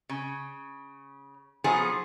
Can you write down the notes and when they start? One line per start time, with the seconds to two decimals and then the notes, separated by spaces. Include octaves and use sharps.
0.09 C#3
1.64 F3 F#3 B3 D#4 G#4